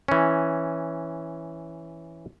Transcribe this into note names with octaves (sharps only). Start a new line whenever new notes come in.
E3 C#4